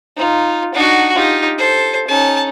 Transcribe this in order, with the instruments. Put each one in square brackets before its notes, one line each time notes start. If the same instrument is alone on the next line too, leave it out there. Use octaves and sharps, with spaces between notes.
[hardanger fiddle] D#4 F4
[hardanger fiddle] D4 F#5 [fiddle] D#4 F#4
[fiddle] D#4 [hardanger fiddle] F4 G4
[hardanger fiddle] A4 [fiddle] C5
[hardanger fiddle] C#4 D#4 [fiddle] A5